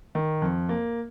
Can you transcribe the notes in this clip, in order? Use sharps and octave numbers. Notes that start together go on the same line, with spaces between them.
D#3
F2
A#3